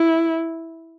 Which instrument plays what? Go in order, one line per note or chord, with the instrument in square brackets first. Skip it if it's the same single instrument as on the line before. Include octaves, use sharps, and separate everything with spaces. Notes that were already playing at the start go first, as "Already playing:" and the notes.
Already playing: [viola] E4